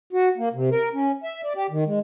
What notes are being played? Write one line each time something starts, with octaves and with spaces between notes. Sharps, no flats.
F#4
A#3
C3
A#4
C#4
E5
D5
G4
D#3
G#3